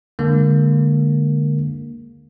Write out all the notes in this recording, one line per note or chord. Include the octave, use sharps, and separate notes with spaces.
D3 G#3 A#3